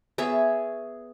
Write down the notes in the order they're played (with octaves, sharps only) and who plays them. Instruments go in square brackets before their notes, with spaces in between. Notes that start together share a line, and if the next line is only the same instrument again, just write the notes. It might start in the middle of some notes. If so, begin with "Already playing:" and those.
[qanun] B3 G#4 C#5 E5